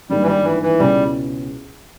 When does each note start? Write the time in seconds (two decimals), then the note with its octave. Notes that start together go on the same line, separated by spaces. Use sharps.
0.10 G#1 G2 D#3 G3 A#3
0.23 E3
0.27 G3
0.44 E3
0.63 E3
0.79 C#2 B2 G3 G#3 C#4 E4